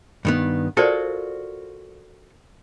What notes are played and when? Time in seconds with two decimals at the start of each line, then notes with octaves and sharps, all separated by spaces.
0.25 G2 D#3 B3
0.77 F4 F#4 A4 A#4 C5 D5